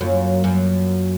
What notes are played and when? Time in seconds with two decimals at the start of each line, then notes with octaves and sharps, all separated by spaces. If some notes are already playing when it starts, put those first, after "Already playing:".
0.01 F#2 F#3 A#3 F4
0.44 F#2